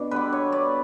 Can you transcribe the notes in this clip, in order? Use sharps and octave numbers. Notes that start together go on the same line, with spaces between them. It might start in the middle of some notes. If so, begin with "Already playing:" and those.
Already playing: B2 D4
D3 G3 B3 B4
C#5
D5